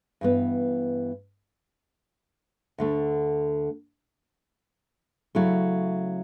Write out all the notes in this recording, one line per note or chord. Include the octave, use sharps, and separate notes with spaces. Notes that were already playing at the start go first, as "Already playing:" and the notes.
G2 E3 B3
D2 D3 A3
C#3 F#3 A3 E4